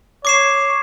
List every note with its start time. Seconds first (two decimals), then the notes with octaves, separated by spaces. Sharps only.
0.25 C#5 D6 C7 E7